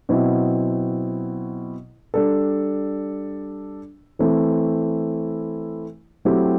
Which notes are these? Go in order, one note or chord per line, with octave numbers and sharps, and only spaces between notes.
B2 F#3 C4 E4
G3 D4 A4
E3 A3 C4 E4
F#3 A3 C4 E4 G4